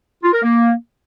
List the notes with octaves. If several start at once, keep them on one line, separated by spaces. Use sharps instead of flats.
F4
A#4
A#3